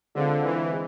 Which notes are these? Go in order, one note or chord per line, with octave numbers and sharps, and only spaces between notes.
D3 G#3 C4 F4
E3
G#3